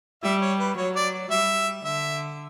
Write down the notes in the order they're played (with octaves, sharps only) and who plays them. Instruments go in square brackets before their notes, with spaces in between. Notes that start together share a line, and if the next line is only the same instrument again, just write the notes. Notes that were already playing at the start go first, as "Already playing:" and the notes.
[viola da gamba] G3 [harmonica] E5
[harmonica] C#5
B4
[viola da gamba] F#3 [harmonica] C#5
[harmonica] D5
[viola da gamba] G3 [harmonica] E5
[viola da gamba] D3 [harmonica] E5